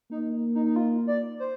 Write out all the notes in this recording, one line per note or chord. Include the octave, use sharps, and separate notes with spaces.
A#3 D#4
D#4
D#4
F4
D5
C5